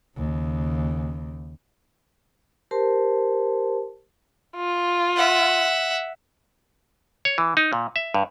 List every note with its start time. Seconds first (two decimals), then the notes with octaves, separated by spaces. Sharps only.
0.17 D#2 C#3
2.71 G4 A#4 C5 A5 C6
4.56 F4
5.16 E5 F#5
7.25 C#5
7.38 E3
7.57 D#4
7.73 A#2
7.96 E5
8.14 G2